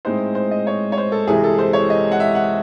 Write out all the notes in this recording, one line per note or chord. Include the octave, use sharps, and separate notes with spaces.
A2 G#3 C4 D#4 C5
C5
D#5
C#5
C#5
C5
A4
C2 C3 E3 G#3 G#4
A4
C5
C#5
D#5
F#5
E5
F#5